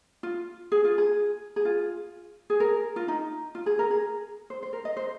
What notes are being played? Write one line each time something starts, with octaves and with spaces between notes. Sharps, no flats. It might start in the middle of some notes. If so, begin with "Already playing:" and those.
F4
G#4
F4
G#4
G#4
F4
G#4
A#4
F4
D#4
F4
G#4
A#4
G#4
C5
C5
A#4
D#5
C5